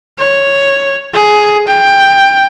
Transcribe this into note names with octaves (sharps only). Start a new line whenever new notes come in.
C#5
G#4
G5